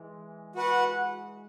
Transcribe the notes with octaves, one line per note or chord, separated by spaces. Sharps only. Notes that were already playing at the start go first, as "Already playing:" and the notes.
Already playing: E3 G#3
F#4 B4 F#5